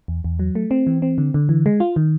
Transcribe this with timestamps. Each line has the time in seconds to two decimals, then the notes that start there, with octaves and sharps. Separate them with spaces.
0.08 E2
0.24 E2
0.39 F#3
0.55 A3
0.71 C4
0.87 E3
1.02 C4
1.18 D3
1.34 D3
1.49 E3
1.66 G#3
1.80 F4
1.96 D#3